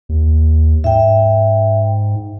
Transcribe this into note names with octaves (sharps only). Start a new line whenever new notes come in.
D#2
G#2 E5 G5